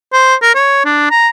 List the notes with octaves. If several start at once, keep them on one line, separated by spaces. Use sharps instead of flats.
C5
A#4
C#5
D4
A#5